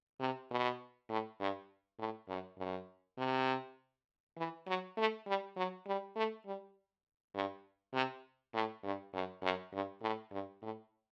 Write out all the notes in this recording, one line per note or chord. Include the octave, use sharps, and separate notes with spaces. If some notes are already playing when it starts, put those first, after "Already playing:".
C3
B2
A2
G2
A2
F#2
F#2
C3
E3
F#3
A3
G3
F#3
G3
A3
G3
G2
C3
A2
G2
F#2
F#2
G2
A2
G2
A2